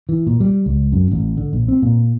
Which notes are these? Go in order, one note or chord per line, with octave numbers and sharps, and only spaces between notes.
E3
A#2
G3
C#2
F#2
A1
D3
A#1
C4
A#2